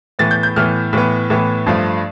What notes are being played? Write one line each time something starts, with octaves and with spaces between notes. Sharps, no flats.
A2 E3 B3 A6
G6
G6
A2 E3 B3 F6
A2 E3 B3
A2 E3 B3
G2 F3 A3